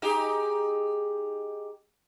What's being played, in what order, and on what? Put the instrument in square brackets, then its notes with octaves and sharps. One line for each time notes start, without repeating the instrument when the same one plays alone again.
[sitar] D#4 G4 G#4